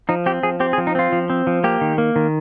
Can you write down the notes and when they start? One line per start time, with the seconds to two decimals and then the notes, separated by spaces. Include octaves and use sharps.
0.09 F3 D#4
0.26 C4 G4
0.43 F3 G#4
0.60 C4 G4
0.73 G#4
0.78 F3
0.87 D#4
0.95 C4 F4
1.12 F3
1.30 C4
1.47 F3
1.64 A#3 G4
1.81 D#3
1.98 A#3
2.16 D#3